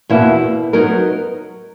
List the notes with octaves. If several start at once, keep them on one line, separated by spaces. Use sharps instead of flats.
E2 B2 A#3 E4
F#3 B3 D#4 A#4